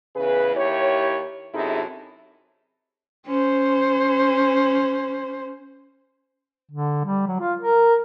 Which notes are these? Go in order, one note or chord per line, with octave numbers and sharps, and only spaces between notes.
E2 C#3 G#4 B4
D#2 E4 G4 C#5
F#2 C3 D#4 E4 G#4 A4
C#4 C5
D3
G3
F#3
F4
A#4